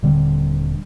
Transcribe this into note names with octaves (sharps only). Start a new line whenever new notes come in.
D#1 D3 G3 C4